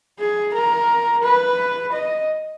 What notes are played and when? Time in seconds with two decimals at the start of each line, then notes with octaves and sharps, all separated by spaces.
0.19 G#4
0.54 A#4
1.23 B4
1.93 D#5